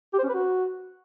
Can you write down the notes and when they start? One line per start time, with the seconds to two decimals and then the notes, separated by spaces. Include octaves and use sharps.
0.13 G4
0.19 C5
0.24 C#4
0.29 B4
0.34 F#4